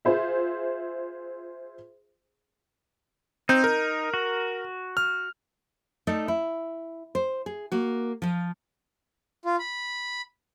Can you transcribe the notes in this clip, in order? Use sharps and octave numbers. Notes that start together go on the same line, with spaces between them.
F4 G#4 C5 E5
C4 D#4 G6
A#4
F#4
F6
A3 D#4 A4 D5 D#5
E4
C5
G#4
A#3 F#4
F3 F4
F4
B5